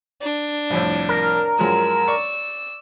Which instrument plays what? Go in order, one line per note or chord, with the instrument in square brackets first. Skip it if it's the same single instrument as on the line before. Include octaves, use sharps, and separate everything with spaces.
[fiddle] D4
[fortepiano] C2 F2 A2
[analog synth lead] A#4
[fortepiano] F#2 F3 G#3 [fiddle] E6
[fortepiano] D5 C#6